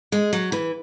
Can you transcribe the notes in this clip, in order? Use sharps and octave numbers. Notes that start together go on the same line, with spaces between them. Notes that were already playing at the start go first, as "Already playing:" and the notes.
G#3
F#3
E3